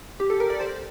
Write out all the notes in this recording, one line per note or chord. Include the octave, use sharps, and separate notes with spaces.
G4
A4
A#4
D5
C5